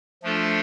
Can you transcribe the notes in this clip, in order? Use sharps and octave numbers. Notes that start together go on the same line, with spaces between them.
F3 A3 D4 F4 A4